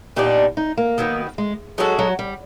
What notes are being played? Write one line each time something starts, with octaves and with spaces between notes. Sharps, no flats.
A#2 G3 B3 D4 D#4
D#4
A#3
D#3 F#3 B3
G#3
F#3 G#3 C#4 F#4 A4
F#3
G3